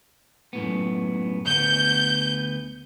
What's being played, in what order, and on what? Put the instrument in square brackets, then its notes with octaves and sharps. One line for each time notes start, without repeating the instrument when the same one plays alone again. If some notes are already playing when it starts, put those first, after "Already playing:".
[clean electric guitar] F#2 A2 B3
[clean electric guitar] D2 B3 [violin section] G6